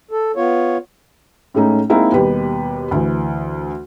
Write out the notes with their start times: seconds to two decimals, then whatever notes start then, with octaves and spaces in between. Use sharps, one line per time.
0.11 A4
0.36 B3 F4 C#5
1.54 A2 G#3 A3 C#4 D#4
1.90 G#3 A#3 C4 D#4 E4 F5
2.12 D#2 B2 G3 B4 G5
2.91 D2 E3